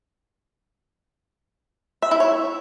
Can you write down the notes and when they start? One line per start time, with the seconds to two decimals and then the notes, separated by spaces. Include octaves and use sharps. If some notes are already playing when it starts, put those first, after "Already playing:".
2.02 E5
2.11 E4
2.20 C#5